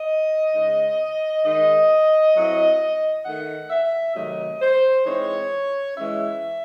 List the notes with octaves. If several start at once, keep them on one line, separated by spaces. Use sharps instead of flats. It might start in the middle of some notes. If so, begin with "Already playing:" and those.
Already playing: D#5
C#3 G#3 D#4
D#3 G#3 D#4 D#5
A2 F#3 C4 E4
D#3 A3 D#4 F#5
E5
C3 D#3 F#3 A3 D#4 D#5
C5
E3 G#3 C4 D#4 C#5
E3 G#3 C#4 E5